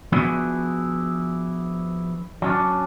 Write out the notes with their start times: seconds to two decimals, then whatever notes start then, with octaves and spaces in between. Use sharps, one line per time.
0.12 F3 B3 D4 E4 F#4 G#4
2.42 F#3 C#4 D4